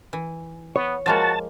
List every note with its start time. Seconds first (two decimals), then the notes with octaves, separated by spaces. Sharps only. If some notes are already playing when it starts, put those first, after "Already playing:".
0.13 E3
0.76 B3 C#5
1.06 F3 G#3 A#3 F#4 A5